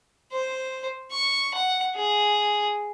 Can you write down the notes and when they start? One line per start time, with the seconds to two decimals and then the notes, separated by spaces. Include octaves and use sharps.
0.32 C5
1.11 C#6
1.54 F#5
1.96 G#4